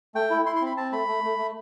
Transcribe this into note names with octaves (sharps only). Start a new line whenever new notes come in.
A3 G5
E4
E4 C6
C6
C4 B5
C4 A5
A3 B5
A3
A3
A3